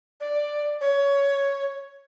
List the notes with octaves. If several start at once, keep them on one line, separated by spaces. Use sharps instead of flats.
D5
C#5